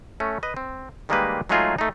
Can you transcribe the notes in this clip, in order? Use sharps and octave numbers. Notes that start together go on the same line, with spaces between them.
A3 C#4
B4 D#5
C4
D#3 G3 G#3 A#3 G4 B4
F#3 G#3 A3 D#4 F4 G#4
A3 D#4